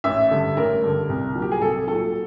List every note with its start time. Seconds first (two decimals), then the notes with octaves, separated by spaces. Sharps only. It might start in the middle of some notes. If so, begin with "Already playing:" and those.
0.04 A1 E5
0.31 G2 D3
0.57 A1 A#4
0.83 G2 D3
1.09 C2
1.35 A#2 F#3
1.42 G4
1.52 G#4
1.61 C2 A4
1.87 A#2 F#3 A4